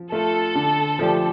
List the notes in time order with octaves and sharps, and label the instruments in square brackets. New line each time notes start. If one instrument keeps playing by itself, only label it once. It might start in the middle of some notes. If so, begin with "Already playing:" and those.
Already playing: [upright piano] F3
[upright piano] A3 F4 [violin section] A4
[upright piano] D3
F3 A3 D4 G4